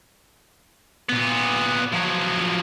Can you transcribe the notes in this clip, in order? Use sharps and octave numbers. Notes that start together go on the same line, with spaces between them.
A#2 B3
F3 F#3